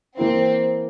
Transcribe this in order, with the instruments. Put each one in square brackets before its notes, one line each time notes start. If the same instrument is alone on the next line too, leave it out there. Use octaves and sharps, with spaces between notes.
[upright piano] E3 A#3 E4 [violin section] C4